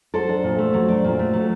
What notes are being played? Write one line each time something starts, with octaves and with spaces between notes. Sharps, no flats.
F#3 A4 C5
D4
A#2
A3
F#3
D4
A#2
A3
F#3